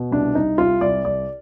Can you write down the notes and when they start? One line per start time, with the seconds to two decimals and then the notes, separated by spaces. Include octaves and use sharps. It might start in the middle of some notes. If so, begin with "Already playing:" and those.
Already playing: B2
0.11 C2 D4
0.35 C2 D#4
0.58 C2 F4
0.81 C2 D5
1.04 C2 D5